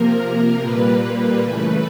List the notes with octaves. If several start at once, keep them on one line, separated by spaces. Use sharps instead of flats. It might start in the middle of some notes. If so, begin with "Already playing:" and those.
Already playing: C3 F3 A#3 A#4
A#2 G3 A#3 B4
C#3 E3 A3 B4